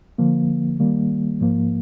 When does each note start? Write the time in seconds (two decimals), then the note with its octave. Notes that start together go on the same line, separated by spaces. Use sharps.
0.18 D3 F3 A#3
0.80 D#3 G3 A#3
1.41 G#2 F3 A#3